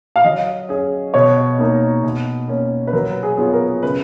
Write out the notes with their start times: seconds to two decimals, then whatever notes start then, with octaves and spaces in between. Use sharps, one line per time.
0.16 F5
0.24 F#3 D#5
0.69 C#4 G#4
1.14 B2 C#5
1.59 A#3 D#4 A#4
2.03 B2
2.48 A#3 C#4
2.87 B4
2.93 F#3 A#4
3.23 G#4
3.37 B3 F4 G#4 C#5
3.53 A#4
3.83 C#3 B4